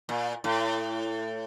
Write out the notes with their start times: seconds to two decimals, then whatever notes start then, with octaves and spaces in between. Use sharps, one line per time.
0.09 A#2
0.44 A2